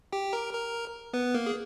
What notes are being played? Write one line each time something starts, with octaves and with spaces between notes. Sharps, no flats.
G4 G5
A#4 A#5
A#4 A#5
B3 B4
A#3 A#4
G#4